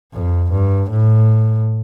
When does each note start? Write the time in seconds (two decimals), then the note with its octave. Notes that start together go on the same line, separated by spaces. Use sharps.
0.13 F2
0.52 G2
0.90 A2